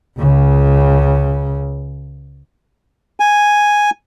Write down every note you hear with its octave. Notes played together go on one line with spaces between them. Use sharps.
C#2 C#3
G#5